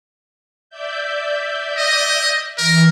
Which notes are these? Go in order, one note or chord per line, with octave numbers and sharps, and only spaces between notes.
D5 E5 G6
D#5
E3 A#4